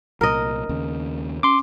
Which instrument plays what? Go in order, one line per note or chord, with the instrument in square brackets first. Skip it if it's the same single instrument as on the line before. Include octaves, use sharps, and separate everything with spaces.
[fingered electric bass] C2 A#2 [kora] A#4 D#5
[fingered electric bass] D#2 C#3
[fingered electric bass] C#4 [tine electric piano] C6 D6